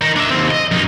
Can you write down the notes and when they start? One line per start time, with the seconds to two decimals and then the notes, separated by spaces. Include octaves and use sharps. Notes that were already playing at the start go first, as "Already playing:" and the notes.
0.01 D#4 A#4
0.16 D4 E5
0.31 D#2 C4
0.51 D#5
0.72 F#2 D#4